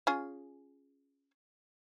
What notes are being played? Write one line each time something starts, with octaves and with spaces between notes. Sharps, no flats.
C#4 F4 G#4